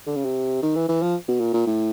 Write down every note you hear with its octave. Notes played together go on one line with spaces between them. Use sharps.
D3
C#3
C3
D#3
E3
E3
F3
B2
A#2
A#2
A2